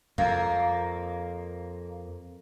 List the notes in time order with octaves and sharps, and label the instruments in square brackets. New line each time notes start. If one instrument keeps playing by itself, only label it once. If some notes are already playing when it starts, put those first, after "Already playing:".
[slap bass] F2 [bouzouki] A#3